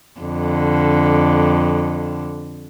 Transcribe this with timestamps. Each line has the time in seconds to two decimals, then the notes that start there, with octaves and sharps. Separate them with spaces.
0.20 F2 D3